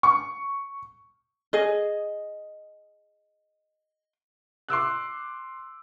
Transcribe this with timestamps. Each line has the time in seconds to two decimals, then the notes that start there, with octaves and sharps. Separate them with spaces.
0.03 C#6
1.53 G#4 D#5
4.69 C6 D6 E6 F#6